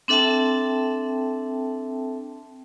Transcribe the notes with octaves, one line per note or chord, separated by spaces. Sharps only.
C4 D4 A4 E5 G5 A5